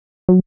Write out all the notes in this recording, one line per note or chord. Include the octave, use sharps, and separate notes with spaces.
F#3